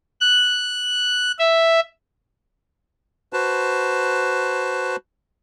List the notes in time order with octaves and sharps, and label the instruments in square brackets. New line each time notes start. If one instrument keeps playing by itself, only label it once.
[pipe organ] F#6
E5
[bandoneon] F#4 B4 C5 A5